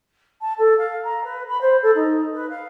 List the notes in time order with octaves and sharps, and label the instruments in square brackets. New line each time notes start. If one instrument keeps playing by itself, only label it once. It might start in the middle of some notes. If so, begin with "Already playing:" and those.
[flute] A5
A4
F5
A#5
B4
B5
C5
A4
D#4
B4
F5